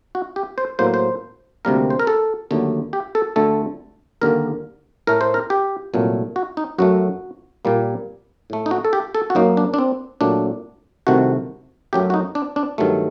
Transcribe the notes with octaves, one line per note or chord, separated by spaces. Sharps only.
F#4
G4
C5
A2 F#3 A#3 C5
C5
D2 C3 G3 A#3 A#4
C5
A#4
A4
D#2 D3 F#3 A3
G4
A4
D2 D3 A3 A4
D#2 D3 G3 A#3 A#4
A2 A3 A#4
C5
A#4
G4
C2 A#2 F#3 A3
F#4
D#4
F#2 F#3 A3 F#4
A#2 G3 A#3
A2 A3
D#4
F#4
A4
G4
A4
F#4
F#2 F#3 A#3 D#4
D4
D4
C4
A#2 F#3 A3 D4
C2 C3 D#3 A3 F#4
F#2 F#3 A3 G4
F#4
D#4
D4
D4
G2 D#3 F#3 A3